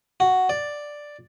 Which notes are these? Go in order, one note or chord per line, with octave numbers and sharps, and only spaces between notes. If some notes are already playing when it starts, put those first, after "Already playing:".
F#4
D5